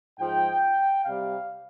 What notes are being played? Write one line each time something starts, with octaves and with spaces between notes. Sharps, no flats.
G#2 F3 G#3 G5
C3 G3 F5